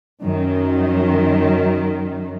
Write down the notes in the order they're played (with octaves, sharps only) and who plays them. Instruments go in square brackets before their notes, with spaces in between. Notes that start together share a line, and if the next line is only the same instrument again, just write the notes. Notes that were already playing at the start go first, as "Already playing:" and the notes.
[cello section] F#2 D#3 F#3